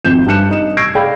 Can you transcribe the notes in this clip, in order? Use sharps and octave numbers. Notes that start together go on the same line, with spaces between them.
G#1 F2 G6 E7
G2 D4 A5 F#6 C#7 E7
D#4 D#5 E7
C#6 E6 G#6 A#6 C7 D7
G#4 D5 F5 G5 B5